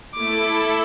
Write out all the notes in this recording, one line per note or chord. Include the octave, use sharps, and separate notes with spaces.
A3 E4 A4 D6